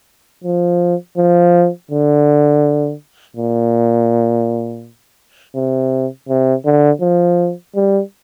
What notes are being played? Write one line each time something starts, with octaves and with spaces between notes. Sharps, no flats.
F3
F3
D3
A#2
C3
C3
D3
F3
G3